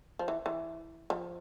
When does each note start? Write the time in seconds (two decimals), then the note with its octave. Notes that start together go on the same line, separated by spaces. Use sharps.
0.19 F3
0.28 E3
0.46 E3
1.10 F3